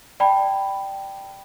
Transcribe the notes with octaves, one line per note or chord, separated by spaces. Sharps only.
D5 G5 A5 B5